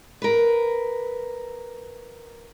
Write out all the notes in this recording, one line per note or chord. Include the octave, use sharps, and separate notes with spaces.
A#4 B4